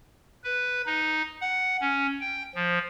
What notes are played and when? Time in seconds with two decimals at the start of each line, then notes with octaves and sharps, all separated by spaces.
0.44 B4
0.86 D#4
1.41 F#5
1.81 C#4
2.21 G5
2.55 F3